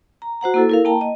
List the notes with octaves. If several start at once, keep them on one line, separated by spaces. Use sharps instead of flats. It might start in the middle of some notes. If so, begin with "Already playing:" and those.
A#5
F#4 C5 F#5 A#5
A#3 E4 A4
E4 A#4 F5
A#3 G5 A5 A#5
D#5